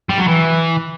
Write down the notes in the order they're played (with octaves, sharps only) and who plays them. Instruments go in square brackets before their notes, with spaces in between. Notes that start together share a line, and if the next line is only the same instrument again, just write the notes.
[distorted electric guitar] G3
F#3
E3